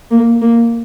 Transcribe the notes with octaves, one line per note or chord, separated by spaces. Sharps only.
A#3
A#3